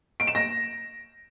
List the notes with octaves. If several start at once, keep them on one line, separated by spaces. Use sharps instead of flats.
D7
E7
A#6